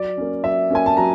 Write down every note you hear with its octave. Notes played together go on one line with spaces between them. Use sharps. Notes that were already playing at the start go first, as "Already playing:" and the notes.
Already playing: F#3 D5
A#3 C#4
F#3 E5
A#3 C#4 G#5
A5
F#3 A#5